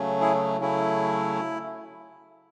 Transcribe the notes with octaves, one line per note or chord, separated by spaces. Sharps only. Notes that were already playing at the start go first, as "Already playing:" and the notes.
Already playing: C#3 F#3 A3 C#4
E4 G#4
C#3 F#3 A3 C#4 E4